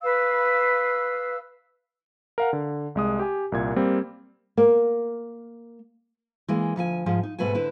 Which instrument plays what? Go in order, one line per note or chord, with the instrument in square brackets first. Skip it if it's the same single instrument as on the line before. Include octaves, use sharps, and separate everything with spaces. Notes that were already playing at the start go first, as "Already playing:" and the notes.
[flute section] B4 F5 E6
[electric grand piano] A#4 F5 F#5
D3
C2 G#3 D#6
G4 G#5
C2 A#2 G#6
G3 A#3 C4
[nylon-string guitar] A#3
[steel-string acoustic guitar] E3 G#3 A#3
D2 F3 F5 G#5
G#2 F3 G#3
D#4
G#2 B2 A3 B4 F#5 G#5
D3 E4 B4 C5